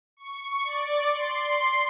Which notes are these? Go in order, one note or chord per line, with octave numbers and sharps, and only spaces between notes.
C#6
D5
C6